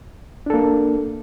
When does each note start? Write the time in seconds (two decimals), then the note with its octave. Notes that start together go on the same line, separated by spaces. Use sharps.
0.46 D4
0.50 A4
0.54 A#3